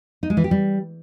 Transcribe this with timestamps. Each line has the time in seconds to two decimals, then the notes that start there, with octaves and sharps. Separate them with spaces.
0.23 D#4
0.30 G#3
0.37 E3
0.44 G4
0.51 G3